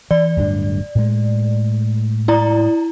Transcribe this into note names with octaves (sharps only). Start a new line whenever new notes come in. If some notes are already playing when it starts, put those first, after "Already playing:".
E3 D5
D1 G2 D4
A2 G#3
E4 D5 A#5